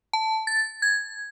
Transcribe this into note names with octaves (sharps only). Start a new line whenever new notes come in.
A5
A6
G#6